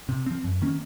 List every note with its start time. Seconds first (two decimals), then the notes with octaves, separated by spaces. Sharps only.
0.09 C3
0.26 F3 C4
0.44 F#2
0.62 D#3 A#3 C#4